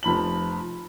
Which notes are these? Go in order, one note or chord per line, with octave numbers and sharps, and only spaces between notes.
F1 F3 B5 F#7